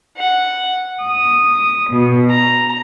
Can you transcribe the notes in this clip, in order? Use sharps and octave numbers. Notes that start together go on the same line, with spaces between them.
F#5
D#6
B2
A#5